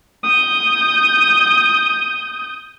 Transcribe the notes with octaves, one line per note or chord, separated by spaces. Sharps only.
D#6 G6